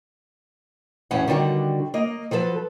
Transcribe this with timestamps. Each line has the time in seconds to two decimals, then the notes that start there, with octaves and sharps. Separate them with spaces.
1.11 E2 A2 F#3 C#4 F#5
1.27 D3 D#3 G3 F#4
1.94 A#3 D#5
2.31 F3 F#3 A4 B4